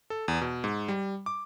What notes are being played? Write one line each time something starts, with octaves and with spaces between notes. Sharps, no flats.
A4
E2
B2
G#2
G3
D6